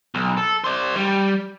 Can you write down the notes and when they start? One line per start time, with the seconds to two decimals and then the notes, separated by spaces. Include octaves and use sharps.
0.15 B1
0.37 A4
0.64 C5 D5
0.96 G3